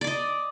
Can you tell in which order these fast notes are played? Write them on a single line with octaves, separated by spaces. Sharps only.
D5 D6 D#5